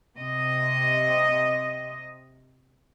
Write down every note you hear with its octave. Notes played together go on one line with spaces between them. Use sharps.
C3 D#5